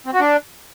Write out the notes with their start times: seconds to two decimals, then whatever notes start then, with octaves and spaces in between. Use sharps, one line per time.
0.06 C4
0.13 F#4
0.20 D4